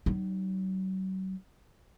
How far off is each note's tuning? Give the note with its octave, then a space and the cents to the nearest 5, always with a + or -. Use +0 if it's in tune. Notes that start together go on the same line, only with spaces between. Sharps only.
F#3 +40 D#4 -30